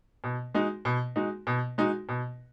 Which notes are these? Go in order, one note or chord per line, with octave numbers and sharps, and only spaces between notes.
B2
G#3 D#4 F#4
B2
G#3 D#4 F#4
B2
G#3 D#4 F#4
B2